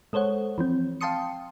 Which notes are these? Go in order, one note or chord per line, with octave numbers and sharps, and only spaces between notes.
G#3 A4 C5 C#5 F#5
E3 F3 C4
F5 G5 A5 C6 D#6 C#7